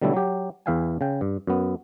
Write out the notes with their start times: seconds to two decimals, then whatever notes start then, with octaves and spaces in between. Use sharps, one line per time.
0.02 B2 D3 F#3 G3 A3 E4
0.14 F#3 G4
0.66 E2 E3 E5 F5 G5 G#5
1.01 C#3 G5
1.21 G2
1.47 F#2 B3